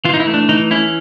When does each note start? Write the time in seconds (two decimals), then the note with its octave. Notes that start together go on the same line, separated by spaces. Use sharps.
0.05 E3 F4
0.14 D#4
0.20 E4
0.27 A3
0.34 D4
0.49 E3 D#4
0.71 C#4 E4